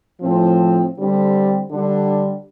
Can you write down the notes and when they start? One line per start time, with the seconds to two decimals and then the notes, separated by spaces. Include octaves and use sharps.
0.21 A2 F3 C4
0.95 D3 G3 C4
1.68 D3 G3 D4